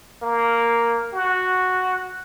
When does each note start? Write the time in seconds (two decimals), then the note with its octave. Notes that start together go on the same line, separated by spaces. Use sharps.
0.22 A#3
1.13 F#4